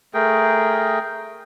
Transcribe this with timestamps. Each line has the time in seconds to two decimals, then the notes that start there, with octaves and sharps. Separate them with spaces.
0.14 A3 G#4 A#4 G5